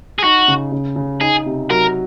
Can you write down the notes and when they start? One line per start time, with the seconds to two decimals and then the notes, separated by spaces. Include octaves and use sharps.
0.19 G#4
0.24 D#4 F#4
0.48 C#3
0.72 C#3
0.96 C#3
1.21 D#4 G#4
1.46 C3
1.70 F#3 A#4